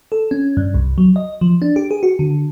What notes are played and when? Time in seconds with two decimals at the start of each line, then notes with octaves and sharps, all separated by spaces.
0.12 A4
0.31 C#4
0.57 G2
0.74 C2
0.98 F#3
1.16 D#5
1.41 F3
1.62 D4
1.76 G4
1.91 G#4
2.03 F#4
2.19 D3